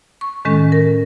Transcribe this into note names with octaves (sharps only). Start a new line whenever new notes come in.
C#6
A2 D#3 G#3 C#4 A4
A#4